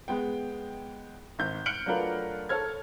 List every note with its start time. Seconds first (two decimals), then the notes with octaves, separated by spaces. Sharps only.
0.08 G#3 B3 G5
1.39 G#1 G6
1.66 F6 F#6 C#7 D7 F#7 G7
1.86 F#3 A3 D4 F4 A#4 B4
2.49 A4 C#5 F6 G#6